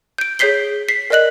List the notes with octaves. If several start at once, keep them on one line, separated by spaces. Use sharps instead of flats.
G6 D7
G#4 C#5 G6 B6 C7 G7
B6 C7
A#4 D5 D#5 F#6 F#7